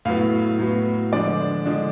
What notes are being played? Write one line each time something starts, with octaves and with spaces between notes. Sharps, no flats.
A2 F#3 B3 F5
A2 F#3 B3
D3 F3 G#3 D4 D5
D3 F3 G#3 D4